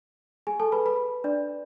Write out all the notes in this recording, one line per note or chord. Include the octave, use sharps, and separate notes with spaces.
G#4 G#5
A4 A5
B4 B5
B4 B5
D4 D5